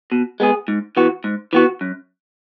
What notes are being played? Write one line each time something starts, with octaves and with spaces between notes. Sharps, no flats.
B2
G#3 B3 G#4
G#2
E3 B3 F#4
G#2
E3 B3 F#4
F#2